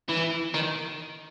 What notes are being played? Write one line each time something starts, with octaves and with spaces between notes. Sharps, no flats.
E3
D#3